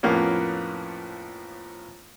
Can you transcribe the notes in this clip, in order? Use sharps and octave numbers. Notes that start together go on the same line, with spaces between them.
F2 A2 F3 A#3 B3 C#4